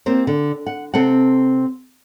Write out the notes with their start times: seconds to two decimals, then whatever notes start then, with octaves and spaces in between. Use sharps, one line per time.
0.06 A#3 C4 G4 C5
0.27 D3
0.66 F#5
0.94 C3 C4 A4 F#5